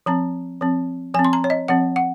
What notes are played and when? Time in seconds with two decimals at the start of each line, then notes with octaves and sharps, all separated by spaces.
0.06 F3 C4 A#5
0.61 F3 C4
1.14 F3 C4 G#5
1.25 C6
1.33 A#5
1.44 C#5
1.50 D#5
1.68 F3 C4 F#5
1.96 F#5